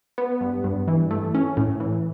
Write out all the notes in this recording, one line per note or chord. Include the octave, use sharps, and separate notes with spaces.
B3
G2
G2
E3
A3
C#4
A2
E3